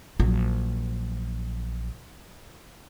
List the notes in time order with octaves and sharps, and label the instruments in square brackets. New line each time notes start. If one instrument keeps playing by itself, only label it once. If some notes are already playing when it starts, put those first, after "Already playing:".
[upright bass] A#1 F#3